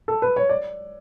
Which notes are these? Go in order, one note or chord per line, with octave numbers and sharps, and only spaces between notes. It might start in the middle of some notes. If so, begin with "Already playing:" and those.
A4
B4
C#5
D5